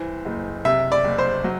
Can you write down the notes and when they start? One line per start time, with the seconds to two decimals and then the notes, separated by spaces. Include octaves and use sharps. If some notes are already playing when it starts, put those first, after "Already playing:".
Already playing: C2 E3 C5
0.25 F#1
0.65 C3 E5
0.92 D5
1.04 F#1
1.18 C5
1.44 F#3